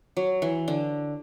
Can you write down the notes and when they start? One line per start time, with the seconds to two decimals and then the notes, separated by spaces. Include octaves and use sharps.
0.17 F#3
0.42 E3
0.68 D3